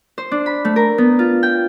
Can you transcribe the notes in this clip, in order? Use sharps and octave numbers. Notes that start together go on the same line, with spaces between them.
C5
D4
B5
A3
A#4
B3
F4
G5